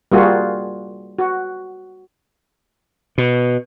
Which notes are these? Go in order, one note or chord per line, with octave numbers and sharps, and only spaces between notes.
G3 A#3 F4 F#4 G#4
F#4
B2